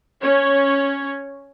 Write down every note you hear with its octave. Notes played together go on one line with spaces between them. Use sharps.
C#4 C#5